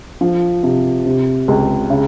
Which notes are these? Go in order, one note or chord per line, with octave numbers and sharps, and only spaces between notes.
F3
C3
C3
C#2
C#3